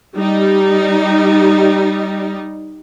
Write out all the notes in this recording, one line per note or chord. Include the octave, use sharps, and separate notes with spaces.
G3 D#4